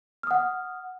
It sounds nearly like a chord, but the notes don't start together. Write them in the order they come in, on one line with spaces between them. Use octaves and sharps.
F6 D#6 F#5